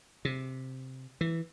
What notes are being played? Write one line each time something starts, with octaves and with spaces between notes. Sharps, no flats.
C3
E3